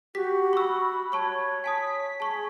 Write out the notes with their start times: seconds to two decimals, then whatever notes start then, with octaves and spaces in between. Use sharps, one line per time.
0.15 F#4 G4 B6
0.53 B5 C#6 E6
1.12 C#5 A5 C#6 F#6
1.64 G#5 A5 D#6 B6
2.20 G#4 A5 C#6